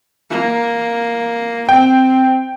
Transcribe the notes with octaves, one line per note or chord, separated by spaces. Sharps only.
A#3
C4 G5